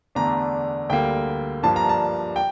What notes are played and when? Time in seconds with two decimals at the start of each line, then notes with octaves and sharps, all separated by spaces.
0.15 E2 D3 A3 D4 A#5
0.90 D2 D3 G3 A#3 G5
1.63 G2 F3 A#3 D4 A5
1.76 A#5
1.89 A5
2.36 G5